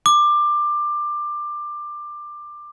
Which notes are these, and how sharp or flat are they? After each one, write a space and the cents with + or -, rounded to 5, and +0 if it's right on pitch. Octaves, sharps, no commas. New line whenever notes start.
D6 +20